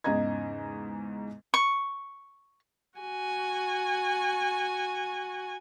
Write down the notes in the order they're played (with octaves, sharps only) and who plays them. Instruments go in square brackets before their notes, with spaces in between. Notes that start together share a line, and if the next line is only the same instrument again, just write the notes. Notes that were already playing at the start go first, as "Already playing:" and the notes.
[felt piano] E2 G#2 C#3 D#5 A#5 G#6
[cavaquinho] C#6
[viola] F#4 G#5